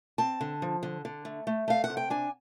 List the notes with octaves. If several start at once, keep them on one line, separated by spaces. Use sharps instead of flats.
C4 A5
D3
F3
D3
D3
A3
A3
A3 F5
F#5
C3
G5
D4 G#5